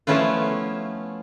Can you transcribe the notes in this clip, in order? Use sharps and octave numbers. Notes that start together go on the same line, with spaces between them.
F3 A3 B3 C#4 E4 F4